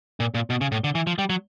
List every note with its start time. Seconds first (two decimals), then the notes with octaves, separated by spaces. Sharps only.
0.20 A#2
0.35 A#2
0.50 B2
0.61 C#3
0.72 A2
0.84 D3
0.95 E3
1.07 F3
1.18 G3
1.30 F#3